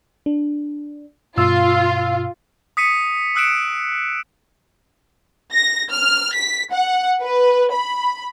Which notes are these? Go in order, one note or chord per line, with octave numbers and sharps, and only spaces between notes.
D4
G2 B2 F4 E6
D#6 B6 C#7 D#7
D#6 E6 F#6 C#7 D7 E7
A#6
F6
B6
F#5
B4
B5